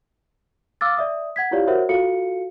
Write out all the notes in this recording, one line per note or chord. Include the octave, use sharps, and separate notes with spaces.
F5 D6 E6 F6 A6
D5 E5 D#6
F#5 G#6 B6
E4 F4 G4 C#5 D5 F5
F#4 A#4 C5 C#5 E5 F#5
F4 F#4 A4 F5 C#7